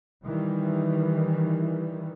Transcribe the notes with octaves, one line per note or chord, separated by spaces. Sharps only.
D#3 E3 G3